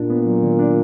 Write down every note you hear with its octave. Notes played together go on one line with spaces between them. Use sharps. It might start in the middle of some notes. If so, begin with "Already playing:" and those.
Already playing: A#2 D4
B3
F#3
D#3
D4